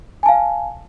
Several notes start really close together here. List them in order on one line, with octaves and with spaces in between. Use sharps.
G#5 A5 F5